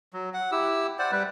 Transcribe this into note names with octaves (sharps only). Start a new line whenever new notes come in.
F#3
F#5
E4 G4 E6
C5 D5 F#5
G3 B4